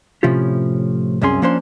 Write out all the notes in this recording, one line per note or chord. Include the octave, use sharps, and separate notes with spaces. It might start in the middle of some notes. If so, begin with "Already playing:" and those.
A2 C3 F3 C#4 F4 G4
C2 F#2 C3 C#4 G#4 C6
F3 A#3 C#4 D4 C5 C6